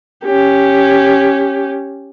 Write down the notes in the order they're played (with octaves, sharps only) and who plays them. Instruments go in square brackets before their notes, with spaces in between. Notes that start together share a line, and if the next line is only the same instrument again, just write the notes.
[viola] C#4 G4